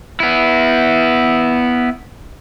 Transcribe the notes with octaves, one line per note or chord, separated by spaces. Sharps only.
B3 E4